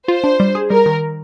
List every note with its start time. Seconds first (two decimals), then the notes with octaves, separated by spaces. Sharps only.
0.08 F4 C5
0.24 D4
0.40 G3
0.55 G#4
0.70 G3 A#4
0.86 D#3